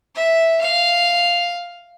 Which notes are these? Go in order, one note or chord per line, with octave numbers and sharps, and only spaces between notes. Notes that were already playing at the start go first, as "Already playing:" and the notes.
E5
F5